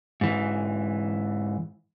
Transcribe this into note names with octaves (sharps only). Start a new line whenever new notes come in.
G#2 E3